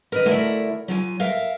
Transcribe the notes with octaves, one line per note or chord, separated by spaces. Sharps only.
A#4 B4 D#5
D2 A3 E4 A#4 D5 E5
F#3 F4 G#5
A#4 E5 F5